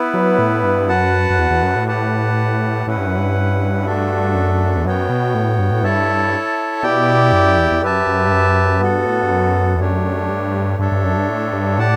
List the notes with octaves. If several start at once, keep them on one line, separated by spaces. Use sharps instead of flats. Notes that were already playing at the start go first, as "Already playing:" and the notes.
Already playing: B3 E4 B4
F#3
A2
G2
F#2 F#4 B4 F#5 A5
F#2
E2
E2
F#2
A2
G4 B4 F#5 A5
A2 C#4 E4 B4 F#5
G2
F#2
G2
A3 D4 F#4 A4 E5
F#2
E2
F#2 B3 F#4 C#5 G5
B2
A2
G2
A2
G2 E4 A4 C#5 E5 A5
B2 E4 G4 D5 G5
F#2
E2
E2
F#2 G4 B4 E5 A5
F#2
G2
F#2
G2 B3 F#4 A4
A2
G2
F#2
E2
F#2 A3 D4 G4 C#5
G2
G2 D4 A4 C#5 E5
G2
F#2
G2
A2
G2
A2 G4 D5 F#5 A5